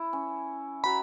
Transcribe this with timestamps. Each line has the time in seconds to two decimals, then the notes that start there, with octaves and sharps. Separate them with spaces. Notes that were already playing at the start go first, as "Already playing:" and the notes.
Already playing: E4
0.13 C#4
0.84 F#3 B5